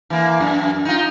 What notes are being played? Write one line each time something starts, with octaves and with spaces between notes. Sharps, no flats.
E3 A#3
F#2
D#4 F4